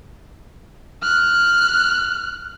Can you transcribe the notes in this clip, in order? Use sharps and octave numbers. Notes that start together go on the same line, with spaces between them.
F6 F#6